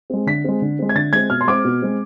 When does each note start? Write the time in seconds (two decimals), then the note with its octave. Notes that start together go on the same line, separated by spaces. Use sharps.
0.10 G#3 C4
0.27 D3 B6
0.44 G#3 C4
0.62 D3
0.79 G#3 C4
0.89 G#6
0.95 D3 A6
1.13 G#3 C4 G#6
1.30 B2 F6
1.41 C6
1.47 G#3 C4 D6
1.65 B2
1.82 G#3 C4